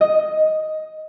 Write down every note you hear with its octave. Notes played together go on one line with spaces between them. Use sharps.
D#5